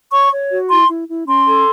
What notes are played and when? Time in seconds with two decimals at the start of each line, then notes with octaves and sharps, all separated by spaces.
0.12 C#5 C#6
0.32 C#5
0.51 F#4
0.70 E4 C6
0.89 E4
1.09 E4
1.27 C#4 C6
1.46 A4